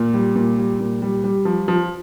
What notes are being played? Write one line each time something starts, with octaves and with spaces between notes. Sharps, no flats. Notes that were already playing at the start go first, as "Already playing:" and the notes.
Already playing: A#2
G3
A#2
G3
A#2
G3
G3
F3
F3